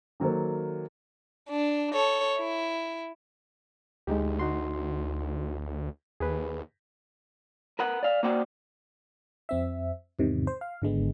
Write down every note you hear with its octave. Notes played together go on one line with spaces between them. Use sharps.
D#3 F#3 A#3 A4 C5
D4
A4 C#5
E4
D2 G#3 D#4 G4
D#4 F#4 C6
D#2 G#4 B4
A#4 B4 F#5
D5 F5
A#3 F#4 C5 D5 F#5 G5
F2 C4 E5
E2 G#2 C3 D#3
C5
F5
G#1 D3 G#3 B3